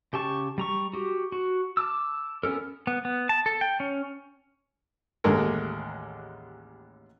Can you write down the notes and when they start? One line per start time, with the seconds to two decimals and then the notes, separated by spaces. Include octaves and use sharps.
0.13 C#3 G4 G5 A5 C#6
0.58 G3 A#5 C#6
0.94 F#4 G4
1.32 F#4
1.77 A5 D6 E6
2.43 B3 C#4 A4 A#4
2.87 B3
3.05 B3
3.29 A5
3.46 A4
3.61 G5
3.80 C#4
5.24 A1 D#2 D3 G#3 A4 A#4